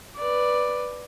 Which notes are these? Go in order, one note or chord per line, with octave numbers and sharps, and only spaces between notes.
B4 D5